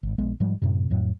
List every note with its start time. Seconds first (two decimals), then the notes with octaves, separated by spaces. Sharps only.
0.03 G#1
0.18 A#1 G#3 B3
0.40 G#2 F3 G3 G#3
0.62 F#2 A2 C3
0.90 F2 A2 F#3